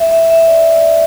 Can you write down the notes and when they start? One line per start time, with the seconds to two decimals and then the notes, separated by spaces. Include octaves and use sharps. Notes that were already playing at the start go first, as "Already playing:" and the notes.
Already playing: E5
0.11 E5
0.30 E5
0.48 D5
0.75 D5